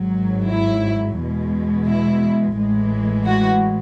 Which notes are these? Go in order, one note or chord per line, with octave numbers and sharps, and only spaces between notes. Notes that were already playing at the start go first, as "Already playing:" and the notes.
Already playing: G#1 G#2 F#3
E4
E2 B2 G#3
E4
A1 A2 E3 G#3
F#4